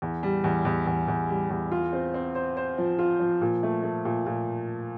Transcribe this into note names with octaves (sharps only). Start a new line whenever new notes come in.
E2
G3
E2
E2
E2
E2
G3
E2
F4
C4
C4
C5
C5
F3
F4
F3
A#2
A3
A3
A#2
A#2